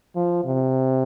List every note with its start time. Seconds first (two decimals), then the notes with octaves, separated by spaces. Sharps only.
0.16 F3
0.45 C3